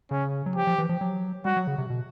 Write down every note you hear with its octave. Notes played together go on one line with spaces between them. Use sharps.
C#3 C#4
F#3
F3 G4
F3
E3
F3
F#3
G3 F#4
F#3
C#3
C3
B2